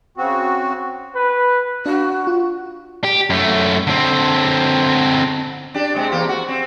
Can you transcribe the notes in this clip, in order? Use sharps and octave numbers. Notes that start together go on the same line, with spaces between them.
C#3 C4 F#4
B4
D4 F#4 F5
F4
G4
F#2 A3
D3 C4
D4 G4
C3 G#3 C4
E2 A#3 G4
F#4
C4